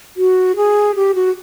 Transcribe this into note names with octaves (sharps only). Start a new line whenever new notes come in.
F#4
G#4
G4
F#4